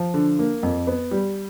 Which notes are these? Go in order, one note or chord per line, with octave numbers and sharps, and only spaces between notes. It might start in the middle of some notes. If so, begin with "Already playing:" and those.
Already playing: F3
D3
A#3
F2
B3
G3